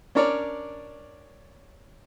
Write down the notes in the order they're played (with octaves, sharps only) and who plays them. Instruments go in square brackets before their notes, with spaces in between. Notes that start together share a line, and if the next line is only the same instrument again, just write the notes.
[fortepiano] C#4 D4 A#4 C#5 D5